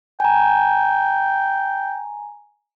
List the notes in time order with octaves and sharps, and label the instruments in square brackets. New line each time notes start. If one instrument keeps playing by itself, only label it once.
[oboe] G5 [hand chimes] G#5 A#5